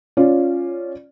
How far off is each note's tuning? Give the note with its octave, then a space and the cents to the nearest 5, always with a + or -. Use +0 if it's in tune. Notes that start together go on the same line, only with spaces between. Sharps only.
C#4 -5 F4 +0 D5 +0